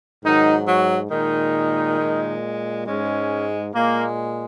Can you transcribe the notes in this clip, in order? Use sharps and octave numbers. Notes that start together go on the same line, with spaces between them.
G#2 D#3 F#3 D#4
F#3 F#4
A#2 D#3 G#3 D#4
A#2 G#3
G#2 G#3 C#4
A#2 G#3 A#3